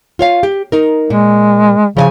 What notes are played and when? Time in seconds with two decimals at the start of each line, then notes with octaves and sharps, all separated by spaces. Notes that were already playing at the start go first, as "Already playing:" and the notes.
0.19 F4 C#5 F5
0.43 G4
0.72 D#4 A#4
1.10 A#2 G#3
1.97 C#3 F3 D#5 G#5